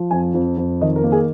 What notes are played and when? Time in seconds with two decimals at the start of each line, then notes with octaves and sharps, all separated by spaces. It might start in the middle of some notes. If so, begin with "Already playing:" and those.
Already playing: F3
0.11 F2 G#5
0.34 F2
0.57 F2
0.81 D#3 D#5
0.96 A#4
1.04 A#3
1.12 G#4